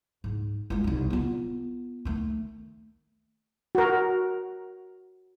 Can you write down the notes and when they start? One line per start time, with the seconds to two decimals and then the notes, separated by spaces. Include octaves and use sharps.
0.24 G#2
0.70 G#3 F4
0.84 C2 D#4
1.10 B3 F4
2.05 D#3 A3
3.75 F#4 A#4